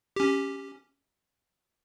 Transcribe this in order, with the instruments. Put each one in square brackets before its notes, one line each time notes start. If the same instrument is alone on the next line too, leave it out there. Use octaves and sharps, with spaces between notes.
[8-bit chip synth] C#4 G4